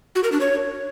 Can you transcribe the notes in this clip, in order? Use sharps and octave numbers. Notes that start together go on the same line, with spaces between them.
F#4
A#4
D4
C#5